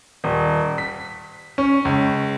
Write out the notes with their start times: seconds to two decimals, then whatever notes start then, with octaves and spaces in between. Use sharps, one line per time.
0.24 D#1
0.78 B6
1.58 C#4
1.85 C#2